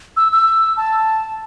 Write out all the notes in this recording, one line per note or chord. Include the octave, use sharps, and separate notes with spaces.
E6
E6
A5